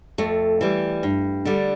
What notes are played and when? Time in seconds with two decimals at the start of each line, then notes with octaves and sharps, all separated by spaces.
0.18 F2 A3
0.61 E3 G3
1.03 G2
1.45 D3 G3